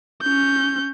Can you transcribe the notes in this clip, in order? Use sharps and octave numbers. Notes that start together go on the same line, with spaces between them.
C#4 G6